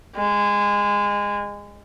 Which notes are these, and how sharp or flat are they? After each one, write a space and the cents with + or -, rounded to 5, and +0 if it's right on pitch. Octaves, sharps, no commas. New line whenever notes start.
G#3 -20